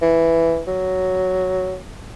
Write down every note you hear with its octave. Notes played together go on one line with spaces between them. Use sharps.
E3
F#3